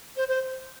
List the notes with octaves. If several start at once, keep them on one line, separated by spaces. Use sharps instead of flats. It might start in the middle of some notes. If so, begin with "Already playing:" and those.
C5
C5